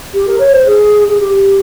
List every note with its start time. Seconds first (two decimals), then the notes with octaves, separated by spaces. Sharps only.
0.13 G4
0.27 A#4
0.39 C#5
0.52 C5
0.66 G#4
1.08 G#4
1.18 G4